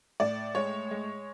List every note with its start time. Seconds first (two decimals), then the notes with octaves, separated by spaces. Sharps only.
0.20 A2 D5
0.55 G#3 C#5
0.91 G#3